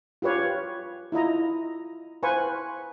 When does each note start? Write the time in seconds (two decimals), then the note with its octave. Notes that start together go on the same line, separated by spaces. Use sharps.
0.22 F4 G4 B4 C#5 F5
1.12 E4 F4 D#5 A#5
2.23 B4 C5 F5 G#5 C#6